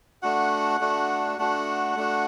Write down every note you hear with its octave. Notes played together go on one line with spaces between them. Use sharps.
A3 D4 F#4 F#5
A3 D4 F#4
A3 D4 F#4 F#5
A3 D4 F#4